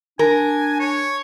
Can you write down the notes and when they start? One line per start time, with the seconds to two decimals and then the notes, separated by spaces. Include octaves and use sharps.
0.19 D4 A#4 G#5
0.80 C#5